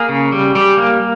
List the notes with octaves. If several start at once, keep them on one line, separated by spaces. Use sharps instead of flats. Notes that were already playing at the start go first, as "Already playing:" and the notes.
Already playing: A#3 G#4
C#3
G3
G3
A#3